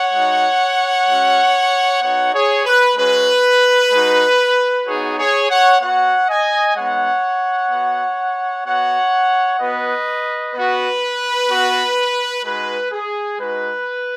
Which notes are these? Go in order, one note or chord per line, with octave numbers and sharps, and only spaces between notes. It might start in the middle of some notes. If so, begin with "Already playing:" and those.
Already playing: C#5 F#5
G#3 D#4 F#4
G#3 C#4 F#4
B3 D#4 F#4 C#5 F#5
G#4 C#5
B4
G#3 C#4 F#4 B4
G#3 D#4 F#4
B3 D#4 F#4 G#4 C#5
G#4 C#5
C#5 F#5
B3 F#4 C#5 F#5
D#5 G#5
G#3 B3 D#4 C#5 F#5
B3 F#4
B3 F#4 C#5 F#5
B3 F#4 B4 D#5
B3 F#4 B4
B3 F#4
G#3 D#4 F#4 B4
G#4
G#3 D#4 F#4 B4